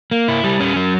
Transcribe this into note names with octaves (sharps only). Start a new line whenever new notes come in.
A#3
E4
G3
C#4
F#3